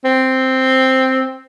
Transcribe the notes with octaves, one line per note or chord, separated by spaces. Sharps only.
C4